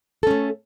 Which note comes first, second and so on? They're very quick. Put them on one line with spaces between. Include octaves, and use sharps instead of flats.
A4 C#4 A3